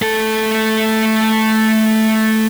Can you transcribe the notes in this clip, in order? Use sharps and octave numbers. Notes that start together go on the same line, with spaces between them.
A3 A4